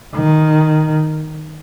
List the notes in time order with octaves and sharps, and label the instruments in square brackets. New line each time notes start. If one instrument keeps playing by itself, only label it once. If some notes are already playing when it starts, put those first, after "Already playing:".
[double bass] D#3